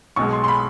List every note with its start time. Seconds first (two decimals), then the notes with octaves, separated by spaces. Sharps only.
0.16 B1 B2 G#3 C#6
0.33 C6
0.44 C6
0.48 B5